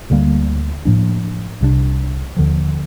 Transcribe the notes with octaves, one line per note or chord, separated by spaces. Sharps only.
D2 D3 G3 A#3
A2 F3 A#3 D4
C2 C3 G3 D4
D#2 D3 F3